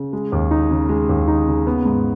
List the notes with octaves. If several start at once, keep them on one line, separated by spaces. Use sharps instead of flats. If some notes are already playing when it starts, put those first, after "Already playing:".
Already playing: C#3
G#3
D#2
D#4
C#3
G#3
D#2
D#4
C#3
B3
G#2